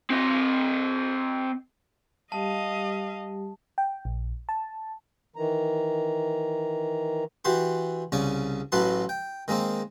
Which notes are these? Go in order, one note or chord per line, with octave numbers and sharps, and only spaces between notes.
C4 D#5
G3 G4 D#5 F5 A5
G5
A#1
A5
D#3 E3 A#5
E3 F#4 G4 C6
C2 C#3 C#5 D5
A1 A2 F#3 B4 A5 C6
G5
D#3 G#3 A#3 C4